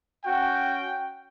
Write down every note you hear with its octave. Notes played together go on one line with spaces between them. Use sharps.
C#4 F#4 G5